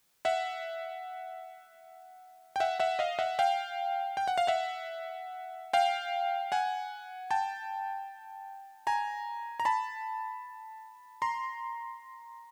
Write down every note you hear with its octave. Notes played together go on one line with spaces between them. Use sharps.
E5 F#5
G5
E5 F#5
E5 F#5
D#5 F5
E5 F#5
F5 G5
G5
F#5
F5
E5 F#5
F5 G5
F#5 G#5
G5 A5
G#5 A#5
A#5
A5 B5
A#5 C6